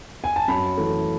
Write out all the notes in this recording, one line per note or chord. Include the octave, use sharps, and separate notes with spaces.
G#5
A5
F#2 B5
E3 A3